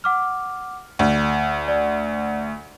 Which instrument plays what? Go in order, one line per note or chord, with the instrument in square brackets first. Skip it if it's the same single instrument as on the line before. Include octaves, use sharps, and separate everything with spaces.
[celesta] F#5 D6 F6
[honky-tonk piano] D2 [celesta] D5
[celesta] D5